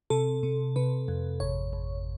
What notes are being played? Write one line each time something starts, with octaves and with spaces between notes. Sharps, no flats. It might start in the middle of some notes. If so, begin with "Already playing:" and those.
C3 A4
C3
C3 B4
F2
G#1 C#5
G#1